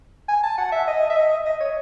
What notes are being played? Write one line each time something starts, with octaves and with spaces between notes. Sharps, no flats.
G#5
A5
F#5
E5
D#5
E5
D#5
D#5
C#5